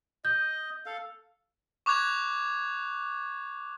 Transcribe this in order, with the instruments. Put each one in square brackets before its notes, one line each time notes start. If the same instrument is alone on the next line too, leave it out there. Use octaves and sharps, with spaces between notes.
[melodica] D#5 [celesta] G6
[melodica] A4 F5
[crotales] C#6 D6 F#6 G#6 F7